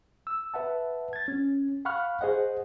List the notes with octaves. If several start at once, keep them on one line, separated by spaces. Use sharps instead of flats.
E6
B4 E5 F#5 A5
G#6 A6
C#4
F5 F#5 B5 C#6 F6 F#6
G#4 C5 D#5 F#5